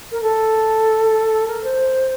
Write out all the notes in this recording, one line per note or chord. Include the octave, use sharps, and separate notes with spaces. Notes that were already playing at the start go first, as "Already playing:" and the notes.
A#4
A4
A#4
C5